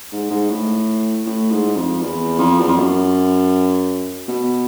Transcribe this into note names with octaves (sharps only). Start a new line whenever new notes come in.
G#2
G#2
A2
A2
G#2
F2
E2
F2
E2
F2
F#2
B2